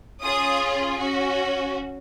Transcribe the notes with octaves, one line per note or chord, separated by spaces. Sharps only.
C#4 F4 G#4 D#6
C#4 F#4